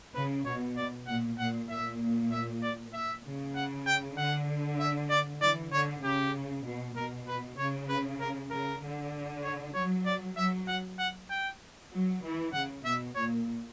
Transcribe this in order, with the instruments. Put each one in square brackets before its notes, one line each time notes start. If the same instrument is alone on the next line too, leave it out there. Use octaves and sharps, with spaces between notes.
[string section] C#3 [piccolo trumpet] B4
[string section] B2 [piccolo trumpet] C#5
[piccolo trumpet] D5
[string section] A#2 [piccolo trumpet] F#5
[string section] A#2 [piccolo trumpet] F#5
[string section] A#2 [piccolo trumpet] E5
[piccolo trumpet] E5
D5
E5
[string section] C#3
[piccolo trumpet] F#5
G5
[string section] D3 [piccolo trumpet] F#5
[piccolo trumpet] E5
D5
[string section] E3 [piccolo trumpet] D5
[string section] D3 [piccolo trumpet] C#5
[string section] C#3 [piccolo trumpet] G4
[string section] B2
[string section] B2 [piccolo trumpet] A#4
[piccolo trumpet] B4
[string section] C#3 [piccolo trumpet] C#5
[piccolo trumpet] B4
A#4
[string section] C#3 [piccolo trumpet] A#4
[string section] D3
[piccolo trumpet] C#5
[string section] F#3 [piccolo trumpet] C#5
[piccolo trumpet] D5
[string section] F#3 [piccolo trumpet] E5
[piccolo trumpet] F#5
F#5
G5
[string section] F#3
E3
[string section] C#3 [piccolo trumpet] F#5
[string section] B2 [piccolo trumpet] E5
[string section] A#2 [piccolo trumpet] C#5